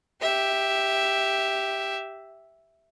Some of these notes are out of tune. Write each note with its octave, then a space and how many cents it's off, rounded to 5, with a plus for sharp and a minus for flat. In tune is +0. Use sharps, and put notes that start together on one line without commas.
G4 +0 E5 +0